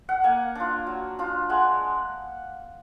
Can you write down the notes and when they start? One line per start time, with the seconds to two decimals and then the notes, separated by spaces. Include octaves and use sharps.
0.09 F#5
0.24 A#3 G#5
0.55 D4 F4
0.87 F#3
1.19 D4 F4
1.49 G#3 F#5